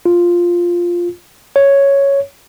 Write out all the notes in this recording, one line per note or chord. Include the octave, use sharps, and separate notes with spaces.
F4
C#5